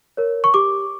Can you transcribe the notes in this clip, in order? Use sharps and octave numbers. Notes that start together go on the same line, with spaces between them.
A#4 C#5
C#6
G4 D6